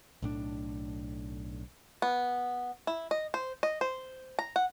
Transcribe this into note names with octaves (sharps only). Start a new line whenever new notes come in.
B1 A2 D4
B3
E4
D#5
C5
D#5
C5
A#5
F#5